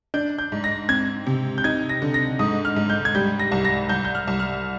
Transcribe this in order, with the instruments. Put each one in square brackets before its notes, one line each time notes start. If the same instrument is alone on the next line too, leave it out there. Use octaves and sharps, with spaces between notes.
[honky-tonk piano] D4 [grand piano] G6
[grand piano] G6
[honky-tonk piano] G#2
[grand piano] A#6
[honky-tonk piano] C4 [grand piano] G#6
[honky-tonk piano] C3
[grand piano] G6
[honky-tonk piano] D#4 [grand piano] G#6
[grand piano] A#6
[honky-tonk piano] D3
[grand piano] A#6
[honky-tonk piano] G#2 [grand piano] D#6
[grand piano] F6
[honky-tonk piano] G#2
[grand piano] G6
G#6
[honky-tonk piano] G3 [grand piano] G6
[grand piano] A#6
[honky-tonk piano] C2
[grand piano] A#6
[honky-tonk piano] C2 [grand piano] G6
[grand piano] G6
F6
[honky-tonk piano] C2
[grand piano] F6